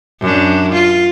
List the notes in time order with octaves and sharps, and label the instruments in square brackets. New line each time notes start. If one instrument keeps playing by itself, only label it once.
[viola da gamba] F#2 D4
F4